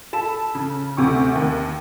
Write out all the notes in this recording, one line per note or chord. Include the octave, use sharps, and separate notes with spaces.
A4 A5 B5 E7
C#3
D2 C3 C#6
D#2